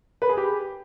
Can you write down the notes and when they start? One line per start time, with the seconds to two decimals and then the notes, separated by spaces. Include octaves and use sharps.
0.22 B4
0.29 G#4
0.37 G4